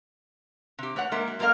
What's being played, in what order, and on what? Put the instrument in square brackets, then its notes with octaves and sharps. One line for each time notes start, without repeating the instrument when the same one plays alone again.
[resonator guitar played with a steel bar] C3 G4
A3 B4 C#5 F#5
G#3 A#3 A#4 E5
F#3
F#2 A#3 A4 A#4 D#5 F5